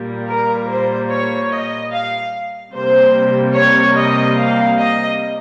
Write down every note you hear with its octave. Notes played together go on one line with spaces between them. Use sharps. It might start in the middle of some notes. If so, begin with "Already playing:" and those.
Already playing: A#2 G3 A#3
A#4
C5
C#5
D#5
F5
C3 G3 A#3 C5
C#5
D#5
F5
D#5